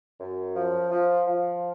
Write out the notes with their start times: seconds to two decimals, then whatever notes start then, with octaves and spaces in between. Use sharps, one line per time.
0.20 F#2
0.56 F3
0.91 F3
1.27 F3